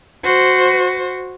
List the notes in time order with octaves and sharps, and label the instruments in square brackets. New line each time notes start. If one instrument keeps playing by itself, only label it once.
[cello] F#4 C5